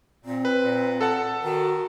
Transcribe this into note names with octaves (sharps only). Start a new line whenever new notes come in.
A#2 C4
B4
A#2
A4 F#5 A5
D#3 F#4